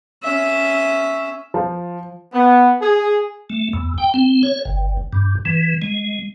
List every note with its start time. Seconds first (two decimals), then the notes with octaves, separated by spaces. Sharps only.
0.23 C#4 E5
1.54 F3
2.33 B3
2.81 G#4
3.50 A3
3.73 E2
3.98 G5
4.14 C4
4.43 C#5
4.65 G1
5.13 G2
5.45 E3
5.82 G#3